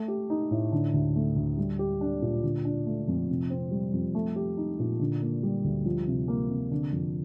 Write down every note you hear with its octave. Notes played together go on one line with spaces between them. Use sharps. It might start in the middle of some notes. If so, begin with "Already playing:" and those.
Already playing: A3
G4
D#4
A2
D3
D2
A3
D2
G3
G4
D4
A#2
D3
D4
A3
F2
C3
C4
G3
F2
A3
G4
D#4
A#2
D3
A#3
G3
D2
F3
C3
A#3
C3
D3
F2